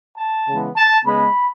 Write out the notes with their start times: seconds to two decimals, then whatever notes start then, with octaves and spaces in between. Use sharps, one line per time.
0.18 A5
0.47 C#3 E3 G#3 B3
0.77 A5
1.05 C#3 G#3 B3 B5